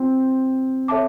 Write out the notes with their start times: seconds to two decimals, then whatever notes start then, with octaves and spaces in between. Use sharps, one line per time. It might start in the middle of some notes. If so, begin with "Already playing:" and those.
Already playing: C4 F4
0.88 A4 C#5 E5 A5 D6